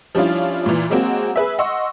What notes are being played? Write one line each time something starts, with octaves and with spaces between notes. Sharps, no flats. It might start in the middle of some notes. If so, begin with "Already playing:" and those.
F3 G3 C#4 D4 E4 F4
A#2 E3
F#3 G#3 A#3 C4 F#4
G#4 B4 E5
D#5 F#5 C6 C#6 E6